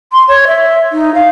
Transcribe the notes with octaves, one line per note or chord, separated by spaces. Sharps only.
C6
C#5
E5
D#4
F5